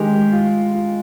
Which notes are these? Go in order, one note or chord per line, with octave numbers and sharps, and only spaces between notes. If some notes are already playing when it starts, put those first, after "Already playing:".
Already playing: D#3 G#3 G4
F4
F4